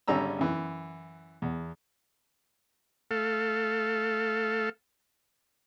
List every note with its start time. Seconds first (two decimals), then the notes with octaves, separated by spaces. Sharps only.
0.08 G#1 D3 G3 C#4 A#5 E6
0.39 F#2 E3
1.42 E2
3.11 A3 A4 F5